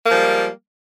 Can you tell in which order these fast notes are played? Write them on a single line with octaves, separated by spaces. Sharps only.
A#3 F3 G3 G#3